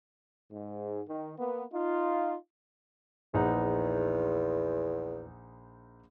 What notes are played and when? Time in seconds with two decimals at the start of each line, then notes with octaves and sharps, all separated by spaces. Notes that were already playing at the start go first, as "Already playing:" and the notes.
0.52 G#2
1.08 D#3
1.37 A#3 B3
1.73 D#4 F4
3.34 A#1 E2 D#4 F#5